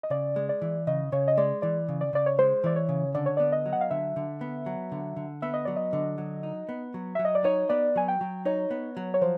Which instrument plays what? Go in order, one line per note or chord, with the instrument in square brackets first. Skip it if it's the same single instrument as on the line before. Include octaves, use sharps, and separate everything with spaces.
[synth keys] D#5
[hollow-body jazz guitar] C#3 [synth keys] D5
[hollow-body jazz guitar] G#3
[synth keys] D5
[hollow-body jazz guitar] E3
[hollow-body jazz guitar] C#3 [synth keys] D#5
[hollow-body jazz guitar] C#3 [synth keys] C#5
[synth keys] D#5
[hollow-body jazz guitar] G#3 [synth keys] D5
[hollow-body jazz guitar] E3 [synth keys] D5
[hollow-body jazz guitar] C#3
[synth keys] D5
[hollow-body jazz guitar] C#3 [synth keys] D5
[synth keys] C#5
[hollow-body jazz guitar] G#3 [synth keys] C5
[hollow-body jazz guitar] E3 [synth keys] D5
[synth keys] C#5
[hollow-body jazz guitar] C#3
[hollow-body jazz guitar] D3 [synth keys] D5
[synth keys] C#5
[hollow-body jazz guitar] B3 [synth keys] D5
[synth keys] D#5
[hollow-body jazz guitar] F#3
[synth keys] F#5
F5
[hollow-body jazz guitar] D3 [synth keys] E5
[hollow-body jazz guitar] D3
B3
F#3
D3
D3
[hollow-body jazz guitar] B3 [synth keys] E5
[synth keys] D#5
[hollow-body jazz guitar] F#3 [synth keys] D5
[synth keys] D#5
[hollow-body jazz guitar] D3
F#3
D#4
B3
F#3
[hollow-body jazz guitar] F#3 [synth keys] E5
[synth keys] D#5
D5
[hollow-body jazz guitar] D#4 [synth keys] C#5
[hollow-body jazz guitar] B3 [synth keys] D5
[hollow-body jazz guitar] F#3 [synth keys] G#5
[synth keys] G5
[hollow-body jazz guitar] F#3
[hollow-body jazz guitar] D#4 [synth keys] C#5
[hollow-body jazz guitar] B3
F#3
[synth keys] C#5
[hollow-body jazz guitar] F3 [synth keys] C5